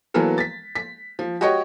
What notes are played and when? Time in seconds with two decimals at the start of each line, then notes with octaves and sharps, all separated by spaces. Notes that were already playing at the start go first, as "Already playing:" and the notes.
0.14 E3 F#3 A#3 B3 A4 A#4
0.38 A6 B6
0.75 B6
1.19 F3
1.41 F#4 G4 C#5 D#5 G5 C#6